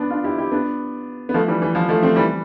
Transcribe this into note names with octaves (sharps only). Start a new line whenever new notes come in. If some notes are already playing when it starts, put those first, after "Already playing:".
Already playing: B3 D4
D4 F4
E4 G4
E4 G4
B3 D4
B3
F3 A3
E3 G3
E3
F3
F3 A3
A3 C4
E3 G3